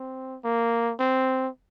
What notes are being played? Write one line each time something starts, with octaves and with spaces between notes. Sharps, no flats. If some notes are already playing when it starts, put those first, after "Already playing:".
Already playing: C4
A#3
C4